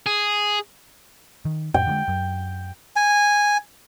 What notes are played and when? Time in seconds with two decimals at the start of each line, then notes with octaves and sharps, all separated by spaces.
0.06 G#4
1.45 D#3
1.74 F2 A2 G5
1.87 D3 F3 G#3
2.08 F#2
2.96 G#5